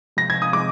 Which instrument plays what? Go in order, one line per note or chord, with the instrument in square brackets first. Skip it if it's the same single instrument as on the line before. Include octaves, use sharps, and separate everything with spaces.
[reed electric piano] C3 F3 G#3 [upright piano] A#6
[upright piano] G#6
D#6
[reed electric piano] C3 F3 G#3 [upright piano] D6